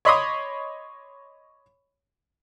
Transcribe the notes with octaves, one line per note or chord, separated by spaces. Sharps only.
C#5 D#5 B5 C6 D6 D#6